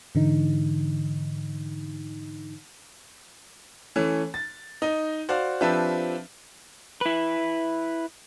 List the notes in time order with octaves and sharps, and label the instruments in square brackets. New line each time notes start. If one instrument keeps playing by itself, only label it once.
[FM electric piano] G#2 D3 E3 D#4
[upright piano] E3 A3 C#4
A6
D#4 D#5
F#4 C5 D5 F5
F3 C4 D4 G4 B4 E5
[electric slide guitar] E4 B4